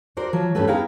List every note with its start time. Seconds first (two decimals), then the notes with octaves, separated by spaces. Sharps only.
0.17 F#4 A#4 C5 D5
0.33 F3 F#3
0.55 G2 A3 C#4 G4 A4 B4
0.67 B3 E4 G#4 F5 G5 A#5